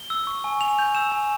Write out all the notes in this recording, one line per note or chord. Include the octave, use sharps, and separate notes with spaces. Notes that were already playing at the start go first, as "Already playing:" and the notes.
Already playing: G7
E6
C#6
G#5
G#5 F7
G6 F7
E6 E7
G#5